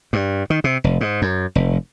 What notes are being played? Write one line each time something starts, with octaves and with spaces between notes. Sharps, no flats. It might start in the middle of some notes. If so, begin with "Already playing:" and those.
G2
D#3
C3
F1
G#2
F#2
F1